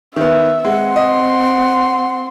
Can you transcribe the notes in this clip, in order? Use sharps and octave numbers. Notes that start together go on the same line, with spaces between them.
D#3 B3 E5
G#3 C4 F#5
D#5 C6